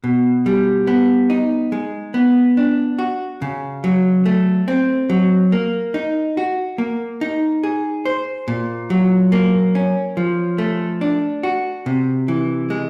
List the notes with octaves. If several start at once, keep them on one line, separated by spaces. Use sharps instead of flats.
B2
G3
B3
D#4
G#3
B3
D4
F#4
C#3
F#3
A3
C4
F#3
A#3
D#4
F#4
A#3
D#4
G#4
C5
A#2
F#3
A#3
C#4
F3
A3
D4
F#4
C3
E3
G#3